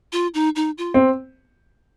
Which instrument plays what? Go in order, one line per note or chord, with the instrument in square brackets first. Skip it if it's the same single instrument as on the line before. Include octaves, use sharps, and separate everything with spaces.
[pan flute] F4
D#4
D#4
F4
[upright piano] C4